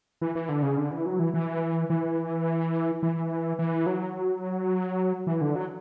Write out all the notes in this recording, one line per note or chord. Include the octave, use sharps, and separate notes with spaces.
E3
E3
D3
C#3
D3
E3
F#3
E3
E3
E3
E3
E3
F#3
E3
D3
F#3